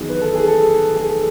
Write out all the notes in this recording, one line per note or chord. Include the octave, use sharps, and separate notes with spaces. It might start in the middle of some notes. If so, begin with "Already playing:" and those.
Already playing: E2 D#3 F#3 G#4
B4
A4
G#4
A4
G#4
A4